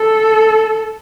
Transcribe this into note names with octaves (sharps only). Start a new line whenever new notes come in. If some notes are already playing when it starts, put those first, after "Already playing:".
Already playing: A4